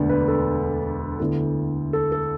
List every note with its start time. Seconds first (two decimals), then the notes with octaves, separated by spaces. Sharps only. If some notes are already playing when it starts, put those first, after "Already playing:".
Already playing: E1 D2 D3 B3 D4
0.09 B4
0.28 A4
1.20 D2 D3 B3 E4
1.93 A4
2.12 A4